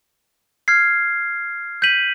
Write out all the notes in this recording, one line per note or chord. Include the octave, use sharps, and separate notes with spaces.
F6 G#6 C7
G6 B6 D#7 F#7